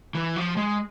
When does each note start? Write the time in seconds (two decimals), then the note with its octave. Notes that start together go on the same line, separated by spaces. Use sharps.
0.15 E3
0.36 F3
0.57 G#3